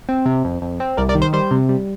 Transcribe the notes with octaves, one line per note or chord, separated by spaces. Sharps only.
C4
C3
F2
F2
C4
C2 A#4 D5
A#4 D5
D#3
C5
G3 C5
C3
G3